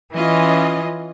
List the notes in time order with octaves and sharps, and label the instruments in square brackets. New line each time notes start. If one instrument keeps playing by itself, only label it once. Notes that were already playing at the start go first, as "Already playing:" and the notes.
[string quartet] E3 [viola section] C#4 F4 D#5